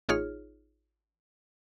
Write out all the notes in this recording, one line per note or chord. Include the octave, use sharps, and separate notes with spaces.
A1 D#4 F4 G#4 C#5 F6